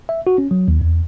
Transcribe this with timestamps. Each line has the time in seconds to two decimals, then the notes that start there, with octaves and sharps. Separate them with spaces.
0.09 E5
0.27 F#4
0.38 C#4
0.51 F#3
0.68 D#2
0.81 E2